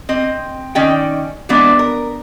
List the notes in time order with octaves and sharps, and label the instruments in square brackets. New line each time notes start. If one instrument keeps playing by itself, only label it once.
[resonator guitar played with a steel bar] C4 D#5
D#3 C#4 D5 D#5 G5
E3 G#3 B3 D4 D5 D#5
A#4